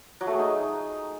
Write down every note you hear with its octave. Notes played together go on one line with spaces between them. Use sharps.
F#3
A3
G#4
D#4